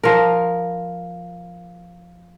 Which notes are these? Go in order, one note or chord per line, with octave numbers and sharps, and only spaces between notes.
F3 A#4